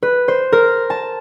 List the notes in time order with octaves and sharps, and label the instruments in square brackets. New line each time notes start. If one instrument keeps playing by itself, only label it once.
[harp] B4
C5
A#4
A5